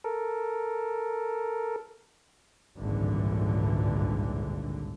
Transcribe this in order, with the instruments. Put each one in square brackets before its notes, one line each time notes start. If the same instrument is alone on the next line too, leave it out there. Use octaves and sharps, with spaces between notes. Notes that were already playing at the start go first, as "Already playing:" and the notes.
[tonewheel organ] A4 A#4
[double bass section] G#1 C#2 G2 A#2 D3 E3